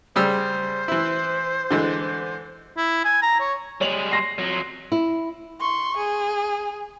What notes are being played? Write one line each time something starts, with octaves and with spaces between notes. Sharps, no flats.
C#3 G3 C5 E6
E3 E4
D3 E3 G#3
E4
G#5
A#5
C#5
G3 G#3 C#5 F7 F#7
C6 A#6 C7
F2 F#3
E4
C6 C#6
G#4